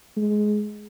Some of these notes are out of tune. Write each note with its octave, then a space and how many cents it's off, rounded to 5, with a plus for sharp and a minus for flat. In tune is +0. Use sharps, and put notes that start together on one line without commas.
G#3 +15